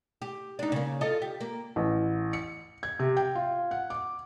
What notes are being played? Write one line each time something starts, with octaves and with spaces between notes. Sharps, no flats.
G4
D4 D#4
C#3 A#3
F4 A4 D#5
G4
A#3
A1
C#7
G#6
C3
G5
F4
F#5
D6